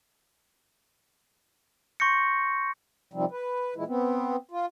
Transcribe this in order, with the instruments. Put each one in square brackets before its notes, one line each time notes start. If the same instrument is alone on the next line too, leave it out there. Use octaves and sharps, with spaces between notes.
[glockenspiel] C6 C#6 G6 A#6 C#7
[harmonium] C3 D#3 F3 G3 C4
B4
A#2 E3 G#3 E4
B3 C4
F4